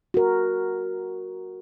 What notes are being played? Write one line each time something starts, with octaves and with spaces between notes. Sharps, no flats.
F#4 A#4